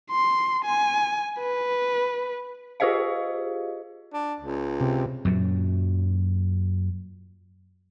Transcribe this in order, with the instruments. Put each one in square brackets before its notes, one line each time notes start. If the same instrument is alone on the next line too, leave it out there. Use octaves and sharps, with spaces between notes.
[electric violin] C6
G#5
B4
[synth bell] F4 G4 G#4 C5 D#5 F5
[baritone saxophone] D4
C#2
[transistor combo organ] C3
[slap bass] F#2 A#2 F#3